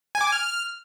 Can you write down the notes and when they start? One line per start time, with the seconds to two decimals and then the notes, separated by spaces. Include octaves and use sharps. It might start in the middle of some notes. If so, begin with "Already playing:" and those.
0.15 G#5
0.21 D6
0.27 G#5
0.32 F6